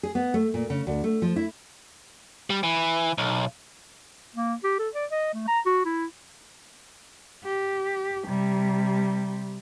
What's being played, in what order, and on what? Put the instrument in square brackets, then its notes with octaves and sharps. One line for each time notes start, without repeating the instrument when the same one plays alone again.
[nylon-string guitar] G#4
B3
A3
A#2
C#3
D2
A3
F3
E4
[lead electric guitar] G3
E3
B1
[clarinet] A#3
G4
A4
D5
D#5
A3
A#5
F#4
E4
[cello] G4
C3 G3